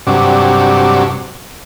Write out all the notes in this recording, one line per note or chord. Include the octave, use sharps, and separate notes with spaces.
G2 C3 F#3 D4